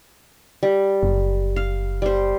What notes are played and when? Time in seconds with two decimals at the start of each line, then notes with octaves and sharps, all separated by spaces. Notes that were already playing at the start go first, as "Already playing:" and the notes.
0.63 G3
1.03 F#1
1.56 F5
2.02 G3 C5